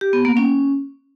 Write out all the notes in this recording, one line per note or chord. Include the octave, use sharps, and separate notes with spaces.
G4
B3
A#3
C#4